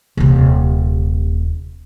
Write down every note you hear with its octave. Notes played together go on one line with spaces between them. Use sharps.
D#1 C3